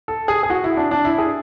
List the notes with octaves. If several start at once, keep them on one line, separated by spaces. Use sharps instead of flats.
A4
G#4
G#4
F#4
E4
D4
D4
E4
G#4